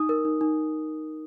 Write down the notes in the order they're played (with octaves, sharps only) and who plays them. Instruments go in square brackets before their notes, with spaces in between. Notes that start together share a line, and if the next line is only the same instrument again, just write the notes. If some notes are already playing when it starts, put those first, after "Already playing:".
Already playing: [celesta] D#4 D#6
A#4
D#4
D#4